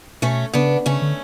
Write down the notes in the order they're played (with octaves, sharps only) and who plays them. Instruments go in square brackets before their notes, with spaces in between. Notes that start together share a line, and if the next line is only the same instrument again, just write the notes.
[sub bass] B2 [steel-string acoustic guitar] A3 C#4
[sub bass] C#3 [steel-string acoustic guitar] B3 D4
[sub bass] C#3 [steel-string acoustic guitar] A3 C#4
[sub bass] D3